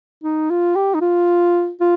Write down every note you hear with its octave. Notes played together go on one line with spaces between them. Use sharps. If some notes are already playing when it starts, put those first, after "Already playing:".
D#4
F4
G4
D#4
F4
F4